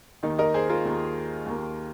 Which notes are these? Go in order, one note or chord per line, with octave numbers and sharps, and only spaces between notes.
D#2 D#3 A#3 D#4
A#4 D#5
G#4 C5
F4 A#4
D#2 D#3 A#3
D#2 D#3 A#3